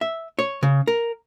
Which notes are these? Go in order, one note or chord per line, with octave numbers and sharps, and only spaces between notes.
E5
C#5
C#3
A#4